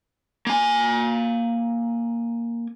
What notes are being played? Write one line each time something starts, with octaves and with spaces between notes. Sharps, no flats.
A#3 G#5